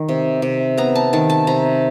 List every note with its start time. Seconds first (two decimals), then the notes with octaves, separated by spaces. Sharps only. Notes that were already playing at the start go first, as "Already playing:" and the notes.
Already playing: D#3
0.09 C3
0.42 C3
0.77 B3 A#5
0.95 A5
1.13 D#3 A5
1.30 A5
1.47 C3 A#5